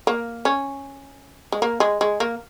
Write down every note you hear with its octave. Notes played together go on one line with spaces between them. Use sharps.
A#3
C#4
G#3
A#3
G#3
G#3
A#3